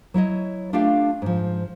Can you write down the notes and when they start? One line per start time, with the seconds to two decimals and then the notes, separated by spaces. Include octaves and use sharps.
0.14 F#3 E4 C#5 D#5
0.73 A3 D4 F4 G4 F5 G5
1.22 G#2 F3